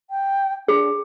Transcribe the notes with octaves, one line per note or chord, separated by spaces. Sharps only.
G5
D4 G#4